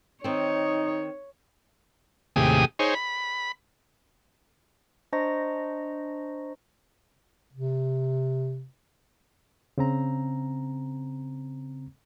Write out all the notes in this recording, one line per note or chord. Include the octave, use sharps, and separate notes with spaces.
D#3 C4 D#4 C#5
D#2 A2 C3 G4 G#4 D#6
D#4 G#4 C5 C#5
B5
D4 C5 D#5 A#5 C#6 A#6
C3
C#3 C4 A#5